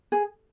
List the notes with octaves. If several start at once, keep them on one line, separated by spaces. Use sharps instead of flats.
G#4